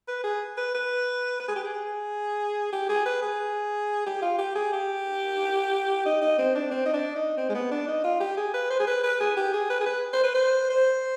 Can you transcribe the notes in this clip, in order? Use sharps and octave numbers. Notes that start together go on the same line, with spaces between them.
B4
G#4
B4
B4
B4
G#4
G4
G#4
G4
G#4
B4
G#4
G4
F4
G4
G#4
G4
D#4
D#4
C4
D4
C4
D#4
D4
D#4
C4
G#3
B3
D4
D#4
F4
G4
G#4
B4
C5
G#4
B4
B4
G#4
G4
G#4
B4
G#4
B4
C5
B4
C5
C5